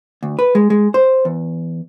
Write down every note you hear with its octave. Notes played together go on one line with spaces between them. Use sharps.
D2
B4
G#3
G#3
C5
E2